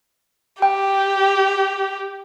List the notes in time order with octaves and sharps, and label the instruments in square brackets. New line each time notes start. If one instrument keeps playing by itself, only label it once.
[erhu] G4 [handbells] G5